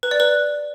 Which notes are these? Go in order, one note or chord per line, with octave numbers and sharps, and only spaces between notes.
B4
D5
B4